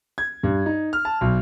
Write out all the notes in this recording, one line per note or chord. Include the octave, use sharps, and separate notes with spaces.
G#6
G2
D#4
F6
A5
B1